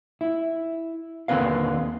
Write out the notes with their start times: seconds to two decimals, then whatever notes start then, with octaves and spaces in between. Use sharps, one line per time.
0.21 E4
1.28 D#2 D3 C4 C#4 B4 F5